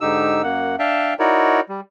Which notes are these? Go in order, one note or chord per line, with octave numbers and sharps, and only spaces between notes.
G#2 D3 D#4 G4 E6
F#2 A#3 F#5
D4 E5 F5 G5 A5
D#4 E4 F#4 A#4 C#5 D5
G3